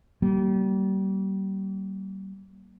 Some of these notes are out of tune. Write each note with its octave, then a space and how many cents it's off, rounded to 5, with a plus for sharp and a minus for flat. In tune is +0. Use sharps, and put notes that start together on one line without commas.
G3 -35 A#3 +0